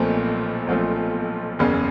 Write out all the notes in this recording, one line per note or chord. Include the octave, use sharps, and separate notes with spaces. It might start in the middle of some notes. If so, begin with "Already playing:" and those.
Already playing: B1 A#2 F3 A3 C4
B1 A#2 F3 A3 C4
F#1 E2 C#3